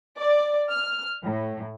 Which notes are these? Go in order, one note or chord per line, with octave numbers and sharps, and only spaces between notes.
D5
F6
A2